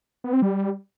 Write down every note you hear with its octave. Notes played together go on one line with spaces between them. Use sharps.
B3
C4
G3